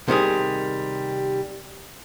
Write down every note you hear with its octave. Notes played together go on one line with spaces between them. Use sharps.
C3 D#3 G3 G#4